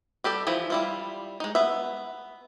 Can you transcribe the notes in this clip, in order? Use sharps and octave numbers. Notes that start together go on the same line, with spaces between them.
G3 G4 A4 D5
E3 F3 E4
G3 E4 F4
G#3 D#4
B3 E5